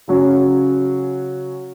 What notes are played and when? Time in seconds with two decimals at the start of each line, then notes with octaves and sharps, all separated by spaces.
0.08 C#3 F#3 C#4 F#4